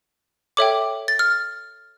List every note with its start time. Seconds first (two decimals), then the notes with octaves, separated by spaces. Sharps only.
0.57 A4 C#5 E5 G5 D6
1.08 A6
1.19 F6